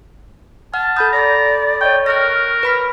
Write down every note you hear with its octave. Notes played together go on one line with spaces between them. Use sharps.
F#5 A5 F6
A4 B5 D#6 G6
D5 A#5
C#5 D#5 G5 C#6
A#4 C#6 F6 F#6 A#6
B4 B5 B6